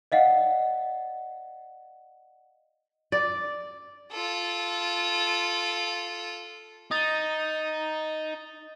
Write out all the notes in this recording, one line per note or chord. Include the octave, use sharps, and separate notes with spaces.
D5 D#5 F5 F#5
D5
F4 A4
D#4 D#6 A6